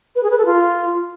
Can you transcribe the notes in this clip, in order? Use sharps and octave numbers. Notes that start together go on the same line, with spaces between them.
B4
G#4
B4
A4
F4